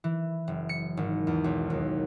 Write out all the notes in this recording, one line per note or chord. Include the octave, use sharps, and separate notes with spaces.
E3
F#1
C#7
G#1
E2
B1
D#2